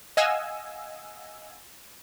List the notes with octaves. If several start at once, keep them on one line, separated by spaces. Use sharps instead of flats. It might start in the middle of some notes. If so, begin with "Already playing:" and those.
D#5 F5 F#5 G#5 E6